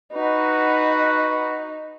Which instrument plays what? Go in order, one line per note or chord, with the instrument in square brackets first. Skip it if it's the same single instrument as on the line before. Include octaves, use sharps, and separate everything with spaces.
[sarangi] D#4 [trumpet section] F#4 B4